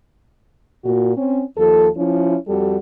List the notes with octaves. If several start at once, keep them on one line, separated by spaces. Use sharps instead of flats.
A#2 F#4
C4 C#4
D#2 F3 A4
F3 C#4 E4
F2 G3 F#4 G4 A4